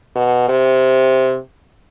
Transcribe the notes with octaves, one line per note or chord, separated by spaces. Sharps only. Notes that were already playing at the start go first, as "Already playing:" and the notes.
B2
C3